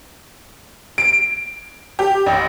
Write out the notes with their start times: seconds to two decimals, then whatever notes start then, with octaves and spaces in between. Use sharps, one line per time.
0.98 D7
1.99 G4
2.26 A1